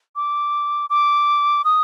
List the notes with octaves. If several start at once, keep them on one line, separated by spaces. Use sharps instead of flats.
D6
D6
D#6